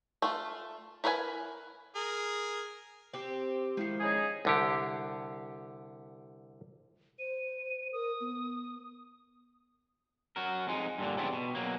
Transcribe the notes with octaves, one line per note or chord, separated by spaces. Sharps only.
A3 F4
E4 A#4 B4 E5 G#5
G#4 A#4
C4 G4 C5
D#3 F3 G#3 E4 C7
C#3 D#4 G#4
C2 D3 G4
C5 D#7
A#4 D#6
B3
F#3 F#4 A#4
F2 G#3 D#4
G2 A#2 D3
C#3 E3 G3 B3 C4 D4
B2
B2 F#3 A#3